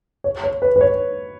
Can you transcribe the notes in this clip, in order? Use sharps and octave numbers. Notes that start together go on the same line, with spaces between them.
C#5
C#5
B4
B4
C#5